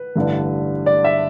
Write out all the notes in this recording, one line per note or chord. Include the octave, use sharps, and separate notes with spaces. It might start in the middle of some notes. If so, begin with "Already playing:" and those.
Already playing: B4
A1 G2 D3 G3
D5
E5